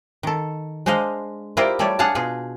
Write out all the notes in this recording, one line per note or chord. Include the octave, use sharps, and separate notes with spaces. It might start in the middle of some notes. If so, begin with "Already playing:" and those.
D#3 A4
G#3 D4 C5 D#5 F5
E4 F4 G4 A#4 C5 D5
G3 A3 G4 C#5 D5
D4 G#4 F5 F#5 A5
B2 F4 G#4